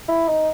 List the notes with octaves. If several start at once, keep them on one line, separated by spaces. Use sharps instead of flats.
E4
D#4